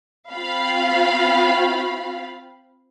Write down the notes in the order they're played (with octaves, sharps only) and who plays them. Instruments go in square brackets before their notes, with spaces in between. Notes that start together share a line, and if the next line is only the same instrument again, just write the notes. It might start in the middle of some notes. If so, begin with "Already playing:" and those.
[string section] C4 F4 F5 B5